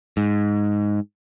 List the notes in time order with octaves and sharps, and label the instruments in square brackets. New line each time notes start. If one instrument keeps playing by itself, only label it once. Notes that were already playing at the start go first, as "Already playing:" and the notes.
[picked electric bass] G#2